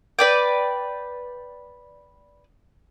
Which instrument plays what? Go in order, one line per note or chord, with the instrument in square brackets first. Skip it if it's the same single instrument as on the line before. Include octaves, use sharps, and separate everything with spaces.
[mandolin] B4 D5 G5